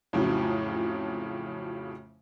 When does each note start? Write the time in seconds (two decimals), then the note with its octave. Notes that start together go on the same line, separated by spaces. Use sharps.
0.13 F2 A2 C#3 F3 F#3